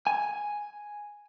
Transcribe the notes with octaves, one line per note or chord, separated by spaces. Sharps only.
G#5